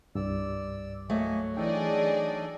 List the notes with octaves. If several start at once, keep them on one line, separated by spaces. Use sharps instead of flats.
C2 G2 D5 E6
F#3 A3 A#3 D#5 G#5
E3 D4 D#4 G#4 A4 D5 D#5 G5